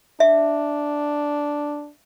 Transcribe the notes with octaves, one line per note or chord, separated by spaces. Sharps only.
D4 E5